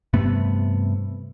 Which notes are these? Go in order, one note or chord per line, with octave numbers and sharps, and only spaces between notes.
G2 C3 A3 B3